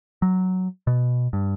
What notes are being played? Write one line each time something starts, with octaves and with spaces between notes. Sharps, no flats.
F#3
B2
G2